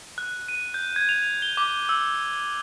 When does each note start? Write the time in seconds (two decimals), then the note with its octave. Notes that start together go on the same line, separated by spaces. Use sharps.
0.18 F#6
0.48 D#7
0.74 G6
0.96 G#6
1.09 F7
1.42 G7
1.57 D6
1.89 E6